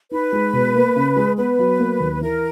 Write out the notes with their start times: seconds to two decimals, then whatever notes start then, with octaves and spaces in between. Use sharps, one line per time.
0.11 D#4 B4
0.32 G#3
0.53 B2
0.75 A#3
0.96 C#3
1.16 G#3
1.37 B3 B4
1.59 F#3
1.80 A#3
2.00 D#2
2.21 E3 A#4